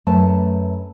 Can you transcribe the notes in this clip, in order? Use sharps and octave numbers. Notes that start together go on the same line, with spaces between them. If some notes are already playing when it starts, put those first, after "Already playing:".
F#2 A3 B4 A5